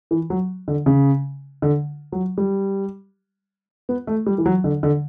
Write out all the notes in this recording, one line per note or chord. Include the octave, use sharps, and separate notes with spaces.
E3
F#3
D3
C#3
D3
F#3
G3
B3
A3
G3
E3
F#3
D3
D3